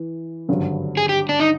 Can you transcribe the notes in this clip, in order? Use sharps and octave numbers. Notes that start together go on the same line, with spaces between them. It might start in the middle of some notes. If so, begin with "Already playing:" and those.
Already playing: E3
G#1 G2 D3 F#3
G#4
G4
D4
D#4